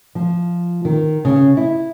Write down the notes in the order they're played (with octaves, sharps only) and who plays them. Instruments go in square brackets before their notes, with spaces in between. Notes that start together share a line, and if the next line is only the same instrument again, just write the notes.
[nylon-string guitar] F3
D#3
C#3
E4